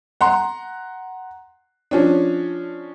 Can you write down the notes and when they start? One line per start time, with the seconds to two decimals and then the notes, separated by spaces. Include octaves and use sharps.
0.21 F#5 A#5 C6
1.91 F3 C#4 D4